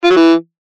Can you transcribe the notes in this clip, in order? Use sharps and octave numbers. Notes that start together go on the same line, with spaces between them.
F4
F#3
E3